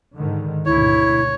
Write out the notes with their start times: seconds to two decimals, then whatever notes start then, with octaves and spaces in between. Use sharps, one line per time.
0.14 G#2 D3 D#3
0.66 D2 G#2 B2 E4 C#5